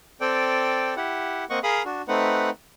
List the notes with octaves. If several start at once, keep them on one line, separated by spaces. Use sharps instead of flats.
C4 A4 D5 G5
E4 G4 F#5
A#3 C4 D#5 F#5 C#6
G#4 A#4 F5 B5 D#6
D4 F#4
A3 C4 D#4 B4 F#5